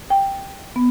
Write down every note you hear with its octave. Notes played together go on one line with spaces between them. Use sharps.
G5
B3